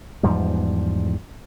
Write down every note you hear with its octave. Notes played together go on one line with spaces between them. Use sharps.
E2 G#2 F3 G3